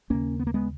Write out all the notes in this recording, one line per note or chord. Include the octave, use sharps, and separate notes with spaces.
D#2 C#3 A#3 C#4
B3
A#3
G#3 B3